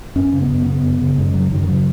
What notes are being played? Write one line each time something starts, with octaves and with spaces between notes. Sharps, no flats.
F#2 C#4
C#3
B3
F#2
C#3 B3
F#2
C#3
F#2 G#3
C#3 F#3
F#2 D#3
D#3
C#3 F#3